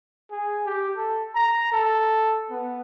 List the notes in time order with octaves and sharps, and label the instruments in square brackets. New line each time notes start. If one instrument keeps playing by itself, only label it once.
[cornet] G#4
G4
A4
A#5
A4
B3